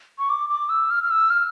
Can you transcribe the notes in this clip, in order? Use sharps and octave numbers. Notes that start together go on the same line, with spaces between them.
C#6
D6
D6
E6
F6
F6
E6
F6